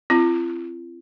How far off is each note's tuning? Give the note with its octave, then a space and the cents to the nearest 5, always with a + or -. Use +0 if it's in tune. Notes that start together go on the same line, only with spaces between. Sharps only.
C4 +5 F4 -45